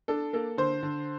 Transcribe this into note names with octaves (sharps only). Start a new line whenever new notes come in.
D4 A4
A#3 A4
D3 C5
D3